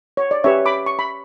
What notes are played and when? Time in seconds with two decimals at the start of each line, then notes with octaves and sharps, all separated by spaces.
0.17 C#5
0.31 D5
0.44 C#4 G4 B4 C#5 E5
0.66 B5 D6
0.86 C#6
0.99 B5